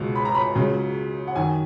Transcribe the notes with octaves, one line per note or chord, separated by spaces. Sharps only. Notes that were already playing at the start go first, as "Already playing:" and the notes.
Already playing: C#2 B2 F#3
B5
A#5
B5
C#2 C#3 F#3
F#5
F#2 D#3 F#3 G#5